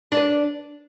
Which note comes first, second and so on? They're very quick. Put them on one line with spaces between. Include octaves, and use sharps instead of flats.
D4 D5 B4